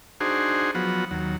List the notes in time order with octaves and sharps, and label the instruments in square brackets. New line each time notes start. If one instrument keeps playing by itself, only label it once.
[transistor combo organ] D4 D#4 F#4 G#4 C5
F3 F#3 B3 F#4
D#2 F#3